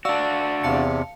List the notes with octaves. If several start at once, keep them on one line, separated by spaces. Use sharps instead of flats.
D4 F#4 D5 F5 E6
E2 C3 F5 A5 C#7